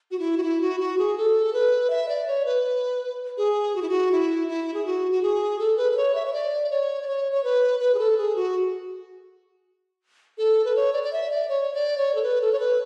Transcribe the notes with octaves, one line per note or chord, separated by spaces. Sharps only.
F#4
E4
F#4
E4
F#4
F#4
G#4
A4
B4
E5
D5
C#5
B4
G#4
F#4
E4
F#4
E4
E4
G#4
F#4
F#4
G#4
A4
B4
B4
C#5
E5
C#5
D5
C#5
D5
C#5
C#5
B4
B4
G#4
A4
G#4
F#4
A4
B4
C#5
D5
D5
E5
D5
C#5
D5
C#5
A4
B4
A4
C#5
B4